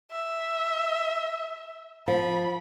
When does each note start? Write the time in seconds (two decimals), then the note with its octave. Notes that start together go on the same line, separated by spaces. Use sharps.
0.12 E5
2.08 F3 B5